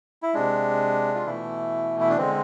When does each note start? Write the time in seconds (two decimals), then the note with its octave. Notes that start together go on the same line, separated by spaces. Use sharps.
0.23 E4
0.34 C3 G#3 D4
1.15 F4
1.26 B2 E3 A3 E4
2.00 E4
2.10 D4
2.17 D3 G#3 C4